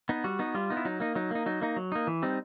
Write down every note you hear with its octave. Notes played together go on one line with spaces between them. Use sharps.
B3 D#4
G3 F#4
B3 D#4
G3 F4
B3 D#4
E4
F#3 D#4
A#3 D#4
F#3 D#4
A#3 D#4
F#3 D#4
A#3 D#4
F#3
A#3 D#4
E3
G3 C4 D#4